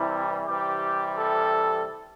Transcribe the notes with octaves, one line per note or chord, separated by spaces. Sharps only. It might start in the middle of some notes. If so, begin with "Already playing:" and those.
Already playing: C3 E3 G3 E4
C3 E3 G3 G4
A4